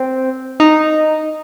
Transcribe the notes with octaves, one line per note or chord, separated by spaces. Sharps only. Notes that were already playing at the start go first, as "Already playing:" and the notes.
Already playing: C4
D#4